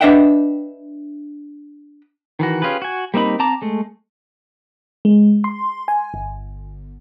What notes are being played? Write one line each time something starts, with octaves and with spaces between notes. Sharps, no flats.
D4 B4 D#5 E5 F#5 G5
D#3 E3 F#4
C#4 F4 G4 G#4 B4
F#4 G#5
G3 A#3 C4 D#4 B5
C4 A5 A#5 D6
G#3 A3
G#3
C6
G#5
G1